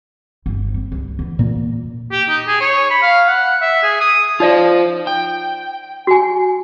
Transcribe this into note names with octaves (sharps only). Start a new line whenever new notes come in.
G1
C4
C2
E2
A#2 A#3
G4
D#4
G#4
C#5
B5
F5
F#5
E5
G#4
D#6
D#4 F4 C5 D5 E5
G5
F#4 G#5